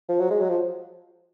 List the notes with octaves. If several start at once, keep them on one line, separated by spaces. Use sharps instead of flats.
F3
F#3
G#3
F#3
F3